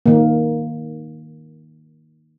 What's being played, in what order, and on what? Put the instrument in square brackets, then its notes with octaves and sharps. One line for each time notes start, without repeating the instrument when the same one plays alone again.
[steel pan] D#3 A#3